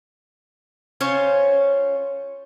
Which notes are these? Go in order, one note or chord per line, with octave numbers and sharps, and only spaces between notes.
C#4 F4 C5 C#5